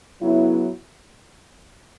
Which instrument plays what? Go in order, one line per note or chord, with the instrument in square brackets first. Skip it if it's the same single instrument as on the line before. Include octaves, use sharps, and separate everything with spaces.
[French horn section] C#3 F#3 B3 E4